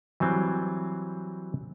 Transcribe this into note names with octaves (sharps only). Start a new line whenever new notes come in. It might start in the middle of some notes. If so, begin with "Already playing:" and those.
E3 F#3 G3 C4